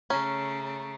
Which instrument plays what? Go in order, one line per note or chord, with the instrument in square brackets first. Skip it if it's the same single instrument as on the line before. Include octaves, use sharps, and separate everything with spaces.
[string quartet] C#3 A3 [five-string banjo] C#4 [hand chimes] A#5